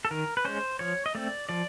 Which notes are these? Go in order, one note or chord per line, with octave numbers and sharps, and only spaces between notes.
A4
D#3 A#4
B4
G#3 C#4 C5
F3 C#5
D#5
A3 C4 D5
F3 D5